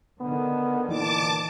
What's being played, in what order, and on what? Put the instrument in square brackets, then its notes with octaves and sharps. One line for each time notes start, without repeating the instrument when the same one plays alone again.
[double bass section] D3 D#3 [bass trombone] B3
[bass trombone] A#2 [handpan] E3 D#4 [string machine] A5 D6